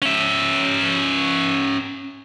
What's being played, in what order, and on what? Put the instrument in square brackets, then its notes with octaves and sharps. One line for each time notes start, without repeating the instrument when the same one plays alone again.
[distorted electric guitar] C#4 E5